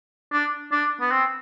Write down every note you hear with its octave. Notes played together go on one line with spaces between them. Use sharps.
D4
D4
B3
C4